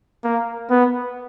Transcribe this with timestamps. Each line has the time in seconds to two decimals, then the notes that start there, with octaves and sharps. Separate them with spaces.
0.24 A#3
0.70 B3